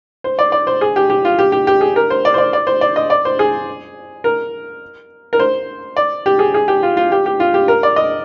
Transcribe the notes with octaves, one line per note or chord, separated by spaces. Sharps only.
C5
D5
D5
C5
G#4
G4
G4
F4
G4
G4
G4
G#4
A#4
C5
D5
C5
D5
D5
C5
D5
D#5
D5
C5
G#4
A#4
A#4
C5
D5
G4
G#4
G#4
G4
F4
F4
G4
G4
F4
G4
A#4
D5
D#5